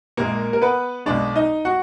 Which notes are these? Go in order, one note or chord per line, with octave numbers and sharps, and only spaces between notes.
A#1 A#2 G#3 A#3 A#4
A#4
B3 B4
B1 B2 G#3 D4 D5
D#4 D#5
F#4 F#5